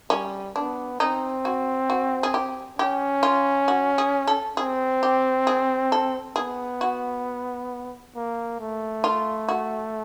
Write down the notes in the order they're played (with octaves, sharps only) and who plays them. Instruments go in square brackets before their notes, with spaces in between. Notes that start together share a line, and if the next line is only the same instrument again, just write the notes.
[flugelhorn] G3 [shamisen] C#4
[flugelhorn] B3 [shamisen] D4
[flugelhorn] C4 [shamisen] D#4
[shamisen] F#4
F#4
G#4
G4
[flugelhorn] C#4 [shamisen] G4
[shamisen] F4
F#4
G#4
A4
[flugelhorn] C4 [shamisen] G#4
[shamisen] G4
G#4
A4
[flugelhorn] B3 [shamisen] G#4
[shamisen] F#4
[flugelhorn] A#3
A3
[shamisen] F4
F#4